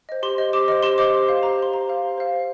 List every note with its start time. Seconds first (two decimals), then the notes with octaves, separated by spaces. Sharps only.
0.09 C5 D#5
0.23 G4 C6
0.38 C5 D#5
0.53 G4 D6
0.68 C5 D#5
0.83 G4 C6
0.98 C5 D#5 D6
1.14 G4
1.28 C5 F5
1.43 G4 A#5
1.58 C5 F5 C6
1.72 G4 A#5
1.88 C5 F5
2.03 G4
2.18 C5 F5
2.32 C5